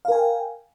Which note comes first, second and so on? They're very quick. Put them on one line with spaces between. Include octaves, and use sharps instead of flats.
F5 A#4 G#5 G5